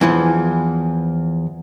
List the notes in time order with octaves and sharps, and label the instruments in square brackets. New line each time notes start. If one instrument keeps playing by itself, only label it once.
[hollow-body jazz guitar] E2 E3 F3